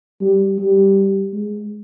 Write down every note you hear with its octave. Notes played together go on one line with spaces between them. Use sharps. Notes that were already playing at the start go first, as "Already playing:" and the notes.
G3
G3
G#3